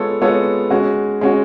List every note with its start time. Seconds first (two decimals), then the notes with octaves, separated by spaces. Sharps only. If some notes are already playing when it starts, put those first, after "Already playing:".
Already playing: G#3 B3 F4 A4 C#5
0.21 G#3 B3 F4 A4 C#5
0.70 G#3 C#4 F#4
1.21 G#3 C#4 F#4